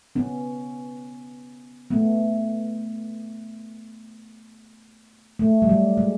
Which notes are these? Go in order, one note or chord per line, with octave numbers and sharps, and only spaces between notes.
B3 C#4
A3 B3
A3
G3
F#3
G#3